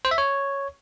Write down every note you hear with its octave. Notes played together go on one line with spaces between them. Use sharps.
C5
E5
C#5